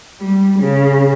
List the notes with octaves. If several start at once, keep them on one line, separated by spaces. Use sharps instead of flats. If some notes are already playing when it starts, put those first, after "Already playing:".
G3
C#3